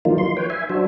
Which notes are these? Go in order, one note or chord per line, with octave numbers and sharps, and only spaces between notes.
D#3 F3 F#3 A#3 D#4 F4
C6
B4 C#5 G5
E5 G#5
F#3 D4 F#4 C5